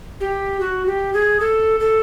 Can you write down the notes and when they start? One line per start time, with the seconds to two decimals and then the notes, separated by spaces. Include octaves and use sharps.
0.20 G4
0.60 F#4
0.86 G4
1.13 G#4
1.40 A4
1.80 A4